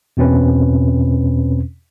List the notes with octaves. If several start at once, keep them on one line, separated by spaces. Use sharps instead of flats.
E2 B2 C4 C#4 B4